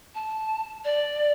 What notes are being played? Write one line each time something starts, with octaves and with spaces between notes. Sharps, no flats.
A5
D5